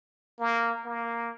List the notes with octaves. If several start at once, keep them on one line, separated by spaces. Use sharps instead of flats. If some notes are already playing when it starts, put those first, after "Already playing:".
A#3
A#3